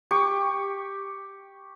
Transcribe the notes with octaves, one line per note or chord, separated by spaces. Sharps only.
G4 C#6